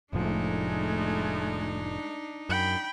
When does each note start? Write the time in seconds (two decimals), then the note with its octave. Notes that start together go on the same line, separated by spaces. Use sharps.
0.13 F1 A2 F3 G#3 A3 D4 D#4
2.49 F#2 G5 B5